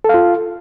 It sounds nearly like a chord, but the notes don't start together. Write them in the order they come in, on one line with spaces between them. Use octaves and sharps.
A4 F5 F4